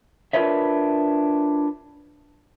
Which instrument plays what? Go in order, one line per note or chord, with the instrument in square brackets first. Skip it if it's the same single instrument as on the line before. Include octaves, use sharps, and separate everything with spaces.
[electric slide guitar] D4 F4 A#4 B4 C#5 E5